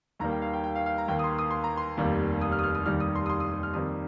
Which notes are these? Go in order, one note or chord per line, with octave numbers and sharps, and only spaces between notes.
D#2 D#3 G3 A#3 A#5
G5
F5
G5
G5
F5
F5
A#5
D#2 D#3 A#3 G5
D#6
C6
D#6
C6
A#5
C6
F1 D#2 D#3 G3 A#3
D#6
F6
D#6
F6
D#6
F1 D#2 D#3 G3 F6
D#6
C6
D#6
C6
D#6
D#6
F6
F2 D#3 G3 A#3 D#6